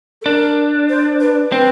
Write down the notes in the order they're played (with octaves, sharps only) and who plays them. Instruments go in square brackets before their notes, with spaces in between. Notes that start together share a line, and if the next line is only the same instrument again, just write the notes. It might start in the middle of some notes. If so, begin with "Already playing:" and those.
[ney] A4
[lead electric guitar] D4 [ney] A#4
[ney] C5
B4
[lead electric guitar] C4 [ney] B4